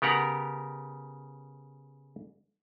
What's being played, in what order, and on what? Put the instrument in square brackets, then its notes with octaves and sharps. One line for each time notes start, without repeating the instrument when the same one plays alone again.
[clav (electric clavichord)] C#3 B3 G4 A#4 F#5 A#5